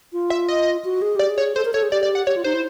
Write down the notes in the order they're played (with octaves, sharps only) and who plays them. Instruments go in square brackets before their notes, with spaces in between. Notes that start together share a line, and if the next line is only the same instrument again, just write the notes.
[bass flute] F4
[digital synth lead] E5
D#5
[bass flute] F#4
G#4
[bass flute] G4 [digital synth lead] D5
[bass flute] G#4
[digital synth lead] C#5
[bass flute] A4 [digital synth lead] C5
[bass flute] A#4
[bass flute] A4 [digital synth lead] C#5
[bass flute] G#4
[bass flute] G4 [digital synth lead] D5
[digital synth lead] D5
F#5
[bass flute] G4 [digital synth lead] C#5
[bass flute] F4
[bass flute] D#4 [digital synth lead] C5
[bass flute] E4